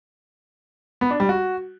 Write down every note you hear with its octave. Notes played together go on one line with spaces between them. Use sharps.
B3
D4
G3
F#4